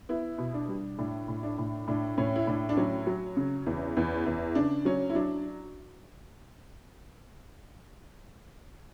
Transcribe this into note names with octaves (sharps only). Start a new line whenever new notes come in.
B3 E4
B2
D4
G3
A2 D4
A2
D4
A2
A2 D4
A2 C#4
E4
A2 D4
D4
F#3 C#4
F#3
C#3
E2
E2
E2
C#3 D4
F#3 C#4
E4
F#3 D4